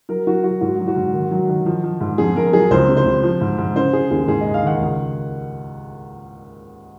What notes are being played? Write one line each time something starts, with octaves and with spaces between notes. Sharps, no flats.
F#3 A#4
F#3 F#4
F#3 F#4
G#2 F#4
F#3
F#4
G#2
D#3
F#3
D#3
F3
F3
G#2
F2 G#4
F2 A#4
F#3 G#4
C#2 C5
C3
C5
C#2
F3
G#2
G#2
C#3 C5
C#3 G#4
D#2 G#4
G#2 G#4
G#2 D#5
F5
D#3 F#5
C#2